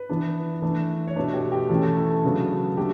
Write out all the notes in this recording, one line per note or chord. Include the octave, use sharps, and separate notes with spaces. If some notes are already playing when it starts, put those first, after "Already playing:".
Already playing: B4
E3 B3 D4
E3 A3 D4
C#5
B2 A3 D4 B4
G4
G4
E3 A3 C#4 A4
A4
A4
A4
C#3 F#3 B3 D4
F#3 A3 D4 G4